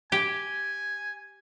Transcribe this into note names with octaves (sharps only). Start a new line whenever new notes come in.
G4 G#5